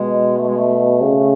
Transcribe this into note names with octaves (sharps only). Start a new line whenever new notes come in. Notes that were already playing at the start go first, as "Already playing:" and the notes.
Already playing: B2 G#3
A3
G#3
A3
C#3